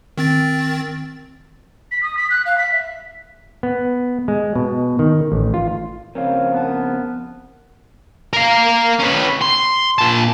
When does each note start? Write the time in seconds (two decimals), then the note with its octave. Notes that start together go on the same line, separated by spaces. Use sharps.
0.18 D#3 C4 A6
1.91 B6
2.03 D#6
2.17 B6
2.30 F#6
2.46 F5
2.58 B6
2.72 E5
3.63 B3
4.28 G#3
4.55 B2
4.99 D#3
5.32 A1
5.54 F4
6.15 F2 C#3 C4 A#4 C#5 F5
6.52 B3 A#4 A5
8.33 A#4 F5
8.99 C#4 B4
9.42 C6
9.98 A#2 A5